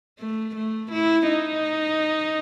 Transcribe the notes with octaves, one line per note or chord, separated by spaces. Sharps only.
A3
A3
E4
D#4